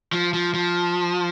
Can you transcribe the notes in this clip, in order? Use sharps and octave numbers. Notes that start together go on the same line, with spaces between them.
F3
F3
F3